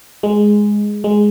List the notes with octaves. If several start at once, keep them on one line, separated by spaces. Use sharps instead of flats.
G#3
G#3